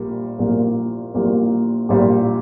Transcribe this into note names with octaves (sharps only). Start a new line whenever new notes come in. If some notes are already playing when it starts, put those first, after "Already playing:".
Already playing: A#1 A#2 G3 A#3
A#1 A#2 G3 A#3
A#1 A#2 G3 A#3
A#1 A#2 G3 A#3